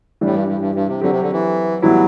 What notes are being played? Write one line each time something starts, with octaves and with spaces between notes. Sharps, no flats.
A2 E3 G3 D4 G4
G2
G2
G2
G2
C3
D3 F#3 C4 G4
C3
D3
E3
A2 E3 F#3 G3 B3 E4